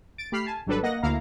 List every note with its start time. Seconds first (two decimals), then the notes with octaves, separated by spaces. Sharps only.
0.18 A6 D7
0.32 A3 G4 B5 F6 C7
0.46 G#5 A5
0.66 G#1 F#3 G3 D4 A4 B4
0.83 A#3 D#5 F#5 A#6
1.03 D2 A#3 E4 F5 A#5